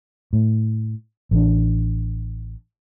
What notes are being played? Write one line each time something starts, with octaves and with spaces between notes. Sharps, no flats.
A2
A1 E3 D4